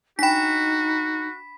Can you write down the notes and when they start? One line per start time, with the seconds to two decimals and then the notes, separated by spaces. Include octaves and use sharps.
0.19 D4 D#4 F#4 G5 B5 B6